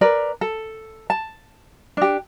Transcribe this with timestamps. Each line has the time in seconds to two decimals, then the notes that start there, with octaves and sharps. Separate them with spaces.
0.01 A#4 B4 D5
0.41 A4
1.10 A5
1.97 D4 G4